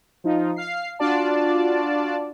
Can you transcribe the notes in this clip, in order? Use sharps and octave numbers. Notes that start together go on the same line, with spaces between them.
F3 D#4 F4
F5 C7
D4 F4 F#4 D5 A5